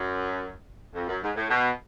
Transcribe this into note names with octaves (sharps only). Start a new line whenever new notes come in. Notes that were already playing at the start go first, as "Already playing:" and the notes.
Already playing: F#2
F2
F#2
G#2
A2
B2